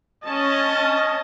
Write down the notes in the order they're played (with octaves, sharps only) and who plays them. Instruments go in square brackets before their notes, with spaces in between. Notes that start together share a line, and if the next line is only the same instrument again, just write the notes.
[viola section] C#4 A5 [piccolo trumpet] D#5